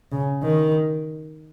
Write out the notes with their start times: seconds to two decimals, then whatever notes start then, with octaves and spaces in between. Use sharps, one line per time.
0.12 C#3
0.43 D#3